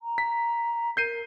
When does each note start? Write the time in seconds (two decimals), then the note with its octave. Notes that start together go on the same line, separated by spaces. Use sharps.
0.02 A#5
0.18 B6
0.97 A#4 G6 C7 D#7